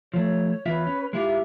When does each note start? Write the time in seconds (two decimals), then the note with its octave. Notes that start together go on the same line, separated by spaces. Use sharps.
0.14 F3 A3 C#5
0.66 E2 F4 B4 C#5 E5
0.87 C#4
1.13 G#3 E4 F4 G4 E5